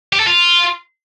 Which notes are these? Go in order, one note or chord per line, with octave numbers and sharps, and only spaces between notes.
G4
A4
F4